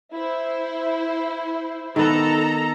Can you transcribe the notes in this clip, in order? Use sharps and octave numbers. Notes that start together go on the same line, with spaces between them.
E4 C5
D#3 B3 A4 A#5